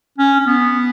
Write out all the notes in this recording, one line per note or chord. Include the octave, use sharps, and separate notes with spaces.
C#4
C#4
B3